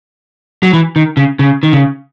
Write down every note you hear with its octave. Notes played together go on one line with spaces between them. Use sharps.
F#3
E3
D#3
C#3
C#3
D#3
C#3